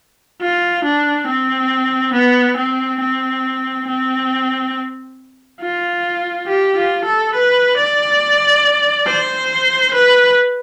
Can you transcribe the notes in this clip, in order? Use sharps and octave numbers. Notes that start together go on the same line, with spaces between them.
F4
D4
C4
B3
C4
C4
C4
F4
G4
F4
A4
B4
D5
C5
B4